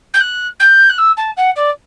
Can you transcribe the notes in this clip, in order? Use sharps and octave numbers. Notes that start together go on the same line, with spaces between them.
G6
F#6
G6
F#6
E6
A5
F#5
D5